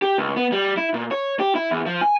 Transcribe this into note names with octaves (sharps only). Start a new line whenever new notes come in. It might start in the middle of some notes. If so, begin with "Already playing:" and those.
G4
C#2
B3
G3
E4
A#2
C#5
G4
E4
E2
F3
G#5